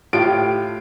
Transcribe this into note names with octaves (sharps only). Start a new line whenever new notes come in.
A2 F4 G4 D7